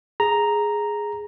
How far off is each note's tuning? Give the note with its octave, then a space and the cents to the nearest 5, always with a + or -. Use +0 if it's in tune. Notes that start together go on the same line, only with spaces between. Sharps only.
G#4 +0 A#5 +0